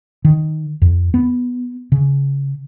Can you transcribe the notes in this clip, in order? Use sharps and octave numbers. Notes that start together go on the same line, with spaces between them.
D#3
F2
B3
C#3